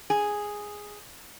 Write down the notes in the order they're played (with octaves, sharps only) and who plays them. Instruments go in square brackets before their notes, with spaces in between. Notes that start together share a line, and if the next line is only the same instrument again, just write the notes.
[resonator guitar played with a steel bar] G#4